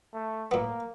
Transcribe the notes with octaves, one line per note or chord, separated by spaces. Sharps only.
A3
A2 A#3 B3